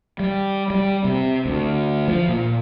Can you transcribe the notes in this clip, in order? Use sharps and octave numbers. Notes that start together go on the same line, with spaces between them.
G3
G3
C3
D2
F3
A#2